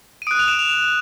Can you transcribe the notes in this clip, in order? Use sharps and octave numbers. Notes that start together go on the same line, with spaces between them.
D#7
D#6 F#6 D7
F7
E7
F7
E7